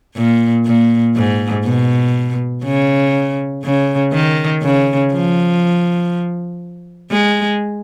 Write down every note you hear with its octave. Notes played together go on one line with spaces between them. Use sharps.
A#2
A#2
G#2
B2
C#3
C#3
D#3
C#3
F3
G#3